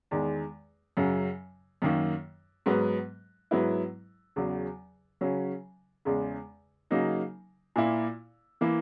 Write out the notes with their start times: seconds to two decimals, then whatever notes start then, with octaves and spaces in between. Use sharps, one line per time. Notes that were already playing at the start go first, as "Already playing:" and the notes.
0.11 E2 D#3 G#3
0.97 F#2 C#3 F#3
1.82 F#2 D#3 A#3
2.66 G#2 F#3 B3
3.51 G#2 F#3 B3 E4
4.36 E2 C#3 F#3
5.21 C#3 F#3 C#4
6.05 E2 C#3 G#3
6.91 C#3 F#3 A#3 D#4
7.76 A#2 A#3 E4
8.61 E3 A#3 E4